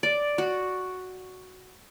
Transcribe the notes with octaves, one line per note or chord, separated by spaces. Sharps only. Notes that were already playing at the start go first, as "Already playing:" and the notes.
D5
F#4